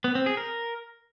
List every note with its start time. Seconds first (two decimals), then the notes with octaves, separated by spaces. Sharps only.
0.04 B3
0.15 C4
0.26 G#4
0.37 A#4